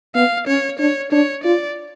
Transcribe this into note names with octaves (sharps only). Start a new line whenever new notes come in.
B3 F5
C#4 C#5
D4 C#5
D4 C#5
F4 D5